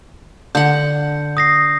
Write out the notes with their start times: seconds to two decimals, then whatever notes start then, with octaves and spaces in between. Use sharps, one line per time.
0.55 D3 F#5 G6
1.37 D#6 A#6 C7